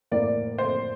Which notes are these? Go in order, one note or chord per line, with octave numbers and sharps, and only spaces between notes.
A2 E3 A#3 D5
C5